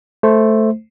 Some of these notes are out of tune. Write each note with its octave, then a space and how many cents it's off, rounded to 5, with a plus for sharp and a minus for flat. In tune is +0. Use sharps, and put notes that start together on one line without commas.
A3 -5 C5 +0